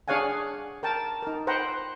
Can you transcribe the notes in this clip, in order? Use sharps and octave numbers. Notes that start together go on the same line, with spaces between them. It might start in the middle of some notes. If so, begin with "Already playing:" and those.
D4 G#4 C#5 F5 F#5 G#5
A#4 G5 A5
D#4 A#4
B4 C5 F#5 G5 A#5